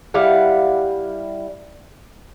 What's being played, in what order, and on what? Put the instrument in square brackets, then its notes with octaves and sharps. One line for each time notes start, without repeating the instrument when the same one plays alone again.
[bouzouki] G3 E4 F5 F#5